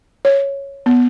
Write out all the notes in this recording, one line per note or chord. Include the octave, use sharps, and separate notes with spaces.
C#5
B3